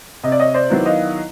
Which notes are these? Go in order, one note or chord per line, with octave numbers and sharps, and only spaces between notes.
C3 D#5
D5
C#5 D#5
C5 D5
D#3 F#3 B3 E4
D#5 F5